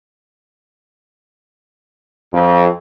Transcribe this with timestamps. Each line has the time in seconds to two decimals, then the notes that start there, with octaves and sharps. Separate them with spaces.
2.33 F2